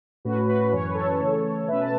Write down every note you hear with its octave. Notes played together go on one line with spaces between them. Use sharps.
A2 A3 C#4 F#4 B4
F#4 B4
F#2 E3 C#4 C#5
B4
A4 C#5
C#3 E3 A3
B2 A3 C#4 B4 E5
A5